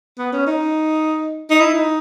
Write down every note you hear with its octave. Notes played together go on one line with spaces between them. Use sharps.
B3
C#4
D#4
D#4
E4
D#4